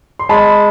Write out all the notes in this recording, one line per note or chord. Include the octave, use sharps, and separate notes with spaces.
C6
G#3 A5 B5